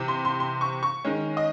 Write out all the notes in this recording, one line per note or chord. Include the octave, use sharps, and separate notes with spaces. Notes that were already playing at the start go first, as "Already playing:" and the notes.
Already playing: C3 E3 C4
C6
C6
C6
C#6
C#6
D#3 G#3 C#4
D#5